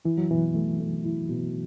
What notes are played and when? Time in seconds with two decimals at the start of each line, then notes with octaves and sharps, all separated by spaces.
0.05 E3 E4
0.18 F#3
0.30 B2 E3
0.54 A3
0.79 A3
1.04 E4
1.29 B2